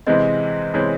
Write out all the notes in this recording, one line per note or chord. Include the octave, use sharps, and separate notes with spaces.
C3 E3 G#3 C4 D#5
C3 E3 G#3 C4 C#5